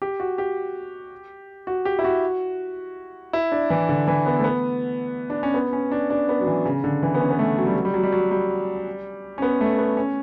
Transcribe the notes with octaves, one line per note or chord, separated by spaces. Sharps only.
G4
F#4
G4
F#4
G4
E4
F#4
E4
D4
E3
D3
E3
B3
A3
B3
D4
C#4
B3
C#4
D4
D4
B3
F#3
E3
C#3
D3
E3
B3
C#4
B3
A3
F#3
G3
F#3
G3
F#3
G3
F#3
G3
C#4
B3
A3
B3
C#4